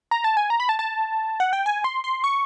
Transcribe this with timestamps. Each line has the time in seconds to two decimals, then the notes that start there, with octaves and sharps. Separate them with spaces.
0.11 A#5
0.24 A5
0.37 G#5
0.50 A#5
0.60 B5
0.69 A5
0.79 A5
1.40 F#5
1.53 G5
1.66 G#5
1.84 C6
2.04 C6
2.24 C#6